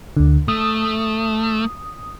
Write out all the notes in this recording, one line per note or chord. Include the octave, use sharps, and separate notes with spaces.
D2 D3
A3 D#6